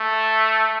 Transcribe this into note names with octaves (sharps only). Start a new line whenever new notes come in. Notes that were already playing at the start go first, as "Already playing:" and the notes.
Already playing: A3